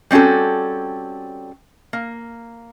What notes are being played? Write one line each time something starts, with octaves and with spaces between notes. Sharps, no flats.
G3 C4 C#4 F#4 A4
A#3